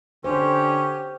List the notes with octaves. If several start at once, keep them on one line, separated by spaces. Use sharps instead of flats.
D3 C#4 G4 C5